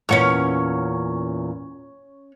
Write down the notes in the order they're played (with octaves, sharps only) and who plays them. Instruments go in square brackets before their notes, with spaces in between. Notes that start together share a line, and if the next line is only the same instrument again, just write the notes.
[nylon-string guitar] E2 A#2 F#5 [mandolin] C#4 C#5 F6